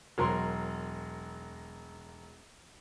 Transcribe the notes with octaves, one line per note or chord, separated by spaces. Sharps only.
E1 F#3 A#4 A#5 C6